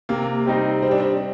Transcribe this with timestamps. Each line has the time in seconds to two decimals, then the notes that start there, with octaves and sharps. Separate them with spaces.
0.09 C3 A#3
0.46 G3 C4 D#4
0.83 G3 C4
0.91 D4
1.00 C4